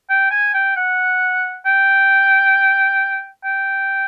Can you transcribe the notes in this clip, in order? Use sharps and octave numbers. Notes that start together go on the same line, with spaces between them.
G5
G#5
G5
F#5
G5
G5